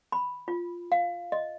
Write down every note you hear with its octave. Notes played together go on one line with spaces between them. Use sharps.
B5
F4
F5
D#5